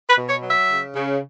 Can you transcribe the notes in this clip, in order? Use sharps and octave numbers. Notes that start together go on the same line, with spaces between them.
B4
B2
C#5
F#3
E5
C#3
C#3